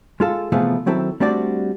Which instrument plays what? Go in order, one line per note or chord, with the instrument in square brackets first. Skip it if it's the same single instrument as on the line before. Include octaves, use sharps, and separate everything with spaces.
[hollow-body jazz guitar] G#3 F4 A4
C3 E3 F3 A3 B3 G#4
D#3 F#3 C4 E4 A4
G3 A3 C4 D4 F#4 D5